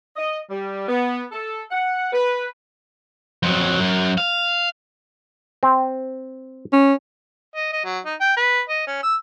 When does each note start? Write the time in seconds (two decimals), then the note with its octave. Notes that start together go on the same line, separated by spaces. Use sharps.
0.16 D#5
0.50 G3
0.89 B3
1.32 A4
1.71 F#5
2.13 B4
3.43 F2 F#3
3.79 F#2
4.18 F5
5.63 C4
6.73 C#4
7.55 D#5
7.73 D#5
7.85 F#3
8.05 D#4
8.20 G5
8.37 B4
8.69 D#5
8.87 C#4
9.03 E6